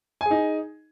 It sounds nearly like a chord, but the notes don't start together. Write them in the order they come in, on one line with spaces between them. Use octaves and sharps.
G#5 G#4 D#4